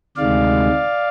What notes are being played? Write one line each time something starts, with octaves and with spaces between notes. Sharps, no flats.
D2 C3 D#3 G#3 D5 F5